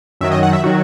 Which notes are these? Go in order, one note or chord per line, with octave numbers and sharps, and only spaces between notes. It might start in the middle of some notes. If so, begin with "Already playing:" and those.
F#2 D#3 F#3 E5
D#5
F#5
E5
D#3 F#3 F#4